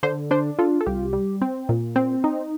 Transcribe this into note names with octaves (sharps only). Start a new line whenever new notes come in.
D3 C5
D4 C5
F4 A4
A4
C2 G4
G3
C4
A#2
C4
D#4